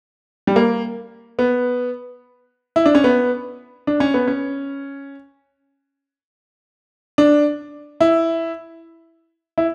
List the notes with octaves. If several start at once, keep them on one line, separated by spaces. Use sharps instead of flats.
G3
A#3
B3
E4
D4
C#4
B3
D4
C#4
B3
C#4
D4
E4
E4